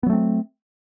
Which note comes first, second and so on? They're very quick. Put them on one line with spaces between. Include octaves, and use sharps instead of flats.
B3 F#3 A3 C4